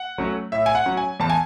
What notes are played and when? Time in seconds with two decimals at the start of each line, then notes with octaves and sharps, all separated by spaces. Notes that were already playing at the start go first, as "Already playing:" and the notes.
Already playing: F#5
0.18 F#3 A3 C#4
0.52 A2 E5
0.66 G#5
0.75 F#5
0.86 F#3 C#4
0.97 G#5
1.20 E2 A5
1.30 G#5